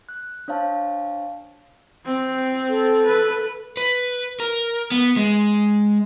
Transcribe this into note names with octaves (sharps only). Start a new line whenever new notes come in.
F#6
D4 C5 C#5 F5 A5
C4
A4
B4
B4
A#4
B3
G#3